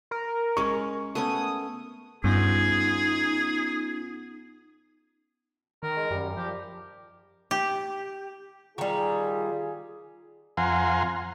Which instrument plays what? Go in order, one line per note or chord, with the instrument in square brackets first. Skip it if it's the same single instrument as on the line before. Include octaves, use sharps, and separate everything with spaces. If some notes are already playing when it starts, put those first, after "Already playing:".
[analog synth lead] A#4
[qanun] G#3 C#4 [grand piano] C#6
[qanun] A3 B3 C#4 [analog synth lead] D#6
[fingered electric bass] G2 [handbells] B3 C#4 F4 [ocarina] D#4 [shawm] G#4
[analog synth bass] D#3 [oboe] A#4
[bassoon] G#3
[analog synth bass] F#2 [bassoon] G3
[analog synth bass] F3 [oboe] G4
[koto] G4
[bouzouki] D#3 G3 [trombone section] F4 G#4
[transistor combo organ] F2 F5 F#5 G#5 A#5 C6